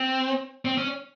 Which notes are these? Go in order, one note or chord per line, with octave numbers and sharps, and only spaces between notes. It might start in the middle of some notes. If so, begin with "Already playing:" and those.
Already playing: C4
C4
C#4